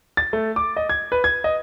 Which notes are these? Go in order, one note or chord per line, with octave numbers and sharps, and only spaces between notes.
A6
A3
D6
D#5
G#6
B4
G#6
D#5